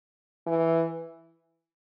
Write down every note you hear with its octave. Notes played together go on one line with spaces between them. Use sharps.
E3